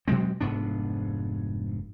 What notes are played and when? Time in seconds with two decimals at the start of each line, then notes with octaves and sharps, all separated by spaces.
0.08 B2 F#3 G#3 C4
0.41 F1 G#2 B3 D4